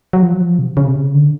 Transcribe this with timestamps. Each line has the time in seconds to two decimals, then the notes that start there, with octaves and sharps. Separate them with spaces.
0.13 F#3
0.23 F3
0.34 F#3
0.41 F3
0.59 C3
0.77 C#3
0.86 C3
0.95 C#3
1.14 D3